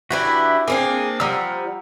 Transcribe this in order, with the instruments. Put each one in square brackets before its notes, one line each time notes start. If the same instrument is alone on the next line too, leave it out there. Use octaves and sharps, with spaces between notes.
[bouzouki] E3 D4 E4 [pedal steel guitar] F#4 G4 B4
[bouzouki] A#3 C4 D4 [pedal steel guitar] G#4
[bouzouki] F3 G3 [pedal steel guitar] F#5 A#5 E6